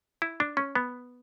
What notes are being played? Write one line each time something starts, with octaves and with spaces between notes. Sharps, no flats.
E4
D4
C#4
B3